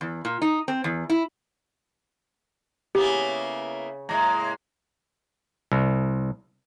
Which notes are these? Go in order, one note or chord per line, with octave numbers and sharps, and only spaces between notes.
E2
A#2
D#4
C4
E2
E4
C#3 A#3 B3 E4 G4
A2 G#3 A#3 A#5
C2